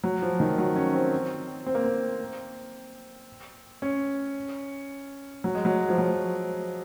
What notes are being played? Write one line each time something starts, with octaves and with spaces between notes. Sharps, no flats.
F#3
F3
D#3
F#3
C#4
C4
C4
A#3
C4
C#4
F#3
G#3
F#3
F3
F#3